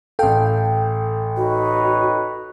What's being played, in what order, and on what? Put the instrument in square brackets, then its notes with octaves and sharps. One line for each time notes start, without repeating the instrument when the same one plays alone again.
[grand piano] A1 F5 [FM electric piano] A4 G5
[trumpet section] D#4 B4 C#5 [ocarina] F#4